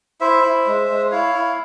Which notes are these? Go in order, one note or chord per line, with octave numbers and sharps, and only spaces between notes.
E4 C5 E5
E4
G#3
G#3
E4 C#5 F5
E4